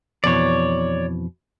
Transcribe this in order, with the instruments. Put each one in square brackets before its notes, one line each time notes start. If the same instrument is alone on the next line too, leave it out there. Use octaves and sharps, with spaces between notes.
[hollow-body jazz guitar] F2 B2 E3 [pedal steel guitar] C#5 D5